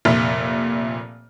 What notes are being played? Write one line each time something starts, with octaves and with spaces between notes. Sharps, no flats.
F1 A#2 E5 F6